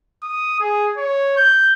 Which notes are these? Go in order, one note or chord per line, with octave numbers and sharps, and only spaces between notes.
D#6
G#4
C#5
G6